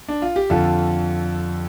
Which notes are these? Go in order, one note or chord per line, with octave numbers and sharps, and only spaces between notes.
D4
F4
G4
F2 D3 F4 A4